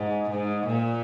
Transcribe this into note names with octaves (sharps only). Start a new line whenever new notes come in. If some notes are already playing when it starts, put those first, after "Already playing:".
Already playing: G#2
G#2
A#2